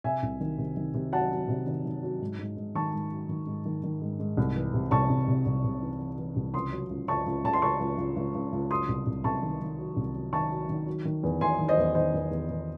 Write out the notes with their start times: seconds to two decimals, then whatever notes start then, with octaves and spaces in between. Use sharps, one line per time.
0.04 C3 E5 G#5
0.23 C2
0.41 D#3
0.58 C3
0.77 D#3
0.94 C3
1.13 F#3 F#5 A5
1.31 F#3
1.49 C3
1.67 D#3
1.85 D#3
2.03 F#3
2.21 G#2
2.39 G#2
2.57 G#2
2.75 D#3 A5 C#6
2.93 G#2
3.11 F#3
3.29 D#3
3.47 G#2
3.65 D#3
3.84 D#3
4.02 G#2
4.20 G#2
4.37 C2
4.56 E3
4.74 C3
4.91 C2 A5 C#6
5.09 C2
5.28 C3
5.46 C2
5.64 C3
5.82 E3
6.00 E3
6.18 E3
6.36 C2
6.54 C#2 C6 D#6
6.72 F#3
6.90 C#2
7.08 C#2 A5 C#6
7.26 C#2
7.44 C#3 A5
7.53 C6
7.62 C#2 A5 C#6
7.80 C#2
7.98 C#2
8.16 C#2
8.35 C#2
8.53 C#2
8.70 F#3 C6 D#6
8.89 C2
9.07 C2
9.24 C2 A5 C#6
9.43 D#3
9.60 D#3
9.78 F#3
9.97 C2
10.15 F#3
10.33 D#3 A5 C#6
10.51 F#3
10.69 D#3
10.87 F#3
11.05 D#3
11.23 E2
11.41 E2 G#5 C6
11.59 D#3
11.68 C5 D#5
11.78 E2
11.95 D#3 C5 D#5
12.14 E2
12.31 E2
12.49 E2